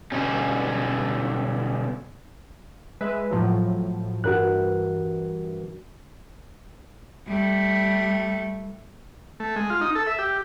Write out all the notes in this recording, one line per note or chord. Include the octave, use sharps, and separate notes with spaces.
B2 D3 G3 C#4
G#3 B4 E5
A2 F3 F#3
G2 E3 F#4 A#4 F#6
G3 A3
A3
G#3
F4
D#4
A4
E5
G4